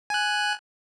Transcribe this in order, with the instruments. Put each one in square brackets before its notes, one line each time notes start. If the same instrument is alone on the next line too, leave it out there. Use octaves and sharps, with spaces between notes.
[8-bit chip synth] G#5 F#6